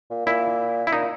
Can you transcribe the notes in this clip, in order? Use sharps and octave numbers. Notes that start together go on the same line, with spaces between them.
A#2
A#2 E4
E4
A#2 D#4